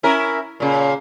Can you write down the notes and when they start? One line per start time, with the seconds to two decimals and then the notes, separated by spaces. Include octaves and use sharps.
0.03 C#4 E4 A#4
0.60 A#2 C#3